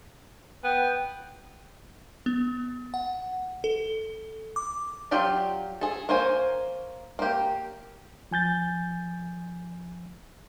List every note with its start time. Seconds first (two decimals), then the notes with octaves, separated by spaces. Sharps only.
0.64 B3 G5
2.26 B3
2.94 F#5
3.64 A4
4.56 D6
5.11 F#3 F4 G4 D5
5.81 G#4 A4
6.09 A#3 C5 C#5 G#5
7.19 A#3 G4
8.31 F3 G#5 G6 A6